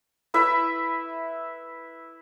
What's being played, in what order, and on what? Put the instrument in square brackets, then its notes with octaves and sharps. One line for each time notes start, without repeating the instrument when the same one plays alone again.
[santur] E4 B4 E5